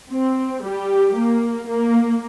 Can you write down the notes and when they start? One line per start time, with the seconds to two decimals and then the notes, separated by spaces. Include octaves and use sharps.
0.11 C4
0.64 G3 G4
1.16 A#3
1.68 A#3